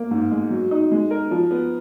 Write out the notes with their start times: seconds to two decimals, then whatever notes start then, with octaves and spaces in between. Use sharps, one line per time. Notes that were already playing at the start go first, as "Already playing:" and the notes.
Already playing: A#3
0.11 G#2
0.31 G#3
0.50 F#3
0.71 D#4
0.91 G#3
1.11 A#4
1.31 F3
1.51 B3